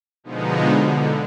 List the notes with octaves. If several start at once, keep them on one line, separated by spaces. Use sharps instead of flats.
B2 D3 F3 G#3 B3 D#4
D3